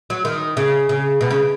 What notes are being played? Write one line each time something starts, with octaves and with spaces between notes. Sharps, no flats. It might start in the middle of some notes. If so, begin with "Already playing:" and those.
F#3
D#3
C#3
C#3
B2
C#3